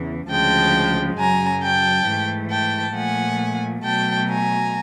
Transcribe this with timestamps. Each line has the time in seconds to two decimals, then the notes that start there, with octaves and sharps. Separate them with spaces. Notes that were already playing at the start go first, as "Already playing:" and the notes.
Already playing: E2 C#3 E3
0.29 D2 C#3 F3 G#3 G5 A5
1.18 F#2 C#3 F#3 G#5 A#5
1.62 G5 A5
2.06 G#2 E3 A3
2.50 G5 A5
2.95 A#2 F3 A3 F#5 G#5
3.83 B2 F#3 A3 G5 A5
4.28 G#5 A#5